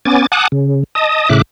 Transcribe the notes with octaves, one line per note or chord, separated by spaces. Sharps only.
B3 C#4 G#5 D6 A6
F#5 G#5 A5 D6 D#6 F#6
C#3
D#5 A5 D#6
A2 C#3 E5 D6 F#6